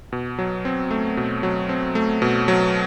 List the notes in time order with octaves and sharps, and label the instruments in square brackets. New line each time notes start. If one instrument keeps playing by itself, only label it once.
[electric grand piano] B2
F#3
C4
A3
B2
F#3
C4
A3
B2
F#3